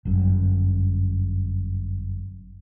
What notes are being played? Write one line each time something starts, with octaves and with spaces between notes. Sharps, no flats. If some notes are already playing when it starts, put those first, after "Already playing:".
G1 F#2